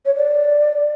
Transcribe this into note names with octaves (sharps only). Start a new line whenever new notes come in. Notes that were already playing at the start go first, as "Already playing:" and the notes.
C#5
D5